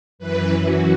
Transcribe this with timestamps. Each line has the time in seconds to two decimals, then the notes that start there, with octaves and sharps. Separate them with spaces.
0.19 F#2 E3 B4
0.62 F#4